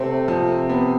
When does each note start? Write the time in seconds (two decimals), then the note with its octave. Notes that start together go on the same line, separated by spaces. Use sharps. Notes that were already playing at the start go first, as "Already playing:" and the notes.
Already playing: C3 A3 C4
0.28 F3
0.69 B3